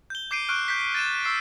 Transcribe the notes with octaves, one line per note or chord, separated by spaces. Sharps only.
G6 G7
D6 G6 C7 D7 D#7
C#6 F6 F#6 D7
G6 B6
A6 D#7 E7
C#6 E6 C7